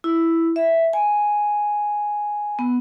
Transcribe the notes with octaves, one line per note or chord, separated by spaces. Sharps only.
E4
E5
G#5
B3